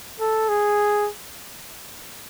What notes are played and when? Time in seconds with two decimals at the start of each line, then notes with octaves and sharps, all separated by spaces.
0.20 A4
0.49 G#4